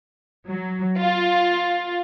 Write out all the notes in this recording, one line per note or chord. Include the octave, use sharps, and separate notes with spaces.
F#3
F4